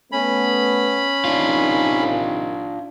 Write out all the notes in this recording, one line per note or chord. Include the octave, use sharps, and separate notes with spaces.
A3 B3 C#4 B5
C3 D#3 D4 D#4 F4